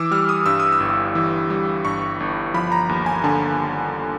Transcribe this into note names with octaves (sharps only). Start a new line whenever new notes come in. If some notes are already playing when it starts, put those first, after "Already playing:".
Already playing: E3 D6 E6
G3 F6
D#6
G2 E6
D#6
E6
G1
E3
G3
G2 C#6
G1
F3 B5
A#5
D#2
G#5
D3 A5